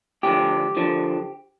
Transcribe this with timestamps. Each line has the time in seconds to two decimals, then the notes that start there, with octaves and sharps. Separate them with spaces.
0.23 D2 D3 F3 G4
0.76 D3 F3